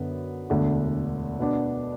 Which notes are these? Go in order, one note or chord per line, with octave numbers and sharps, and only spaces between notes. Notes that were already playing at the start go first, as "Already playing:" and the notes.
Already playing: F#2 D3 B3
E1 D2 D3
B2 B3 D4